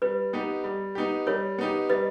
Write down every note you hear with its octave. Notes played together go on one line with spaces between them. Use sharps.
G3 B4
B3 D#4 G4
G3
B3 D#4 G4
G3 A#4 C#5
B3 D#4 G4
G3 B4 D#5